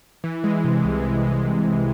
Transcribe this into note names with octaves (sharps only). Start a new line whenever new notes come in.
E3
G#3
C3
C2
E3
G#3
C3
C2